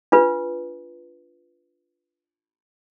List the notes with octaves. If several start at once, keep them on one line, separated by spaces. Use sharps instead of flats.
D4 F4 B4